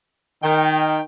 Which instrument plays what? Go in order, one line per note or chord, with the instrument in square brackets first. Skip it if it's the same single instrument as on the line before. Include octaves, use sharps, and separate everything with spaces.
[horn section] D#3 [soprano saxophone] G5